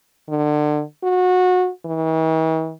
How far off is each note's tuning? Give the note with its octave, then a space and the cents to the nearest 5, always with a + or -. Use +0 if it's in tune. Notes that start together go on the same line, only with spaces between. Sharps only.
D3 +30
F#4 -25
E3 -45